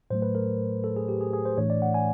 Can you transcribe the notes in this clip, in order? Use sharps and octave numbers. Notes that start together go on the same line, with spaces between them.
A2 F#3 A3 C5
B4
A#4
A4
G#4
G4
G#4
G#4
C5
A2 E3 A3 D4 C#5
D5
F#5
G#5